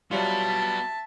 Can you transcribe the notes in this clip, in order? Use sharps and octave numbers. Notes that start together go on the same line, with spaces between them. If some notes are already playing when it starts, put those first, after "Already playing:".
F#3 G3 B3 F4 F#4 E5 A5